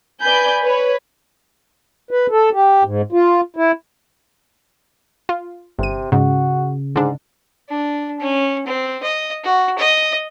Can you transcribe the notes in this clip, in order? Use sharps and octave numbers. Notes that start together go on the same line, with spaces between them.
B4 D5 G#5 B5 G6
B4 C#5
B4
A4
G4
G#2
F4
E4
F4
G1 C3 D#7
G#2 C#3 F#4
G#2 D3 D4
D4
C#4
C4
D#5
F#4
D#5